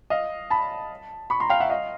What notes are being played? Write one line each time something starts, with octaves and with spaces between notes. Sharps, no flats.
D#5 F5
A5 B5
B5 C#6
A#5 C6
F5 G5
E5 F#5
D#5 F5